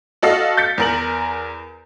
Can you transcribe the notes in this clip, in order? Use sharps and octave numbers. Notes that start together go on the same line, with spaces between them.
F#4 A4 D#5 F5
G6 A6 B6 C#7
E2 A#4 F#7